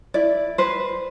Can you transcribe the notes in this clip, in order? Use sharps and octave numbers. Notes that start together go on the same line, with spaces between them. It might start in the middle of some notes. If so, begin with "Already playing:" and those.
E4 D5
B4 C5